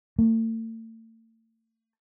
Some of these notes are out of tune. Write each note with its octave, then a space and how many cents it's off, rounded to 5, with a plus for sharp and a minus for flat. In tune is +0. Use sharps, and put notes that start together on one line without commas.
A3 +40